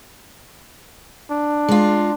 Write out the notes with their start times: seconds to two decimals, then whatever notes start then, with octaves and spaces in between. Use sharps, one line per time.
1.30 D4
1.68 G#3 F4